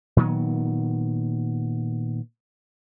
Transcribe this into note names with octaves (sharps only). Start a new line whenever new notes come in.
A#2 D#3 F#3 B3